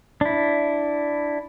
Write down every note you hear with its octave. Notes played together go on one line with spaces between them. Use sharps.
D4 E4